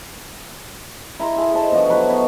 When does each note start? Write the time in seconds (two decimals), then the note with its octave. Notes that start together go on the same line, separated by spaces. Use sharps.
1.20 E4 A#5 C6
1.36 E4 G#4 A4
1.54 C5 D#5 A5
1.72 B2 D3 F3 F#4
1.89 F#3 E4 B4
2.09 B3 D#4 B4 C#5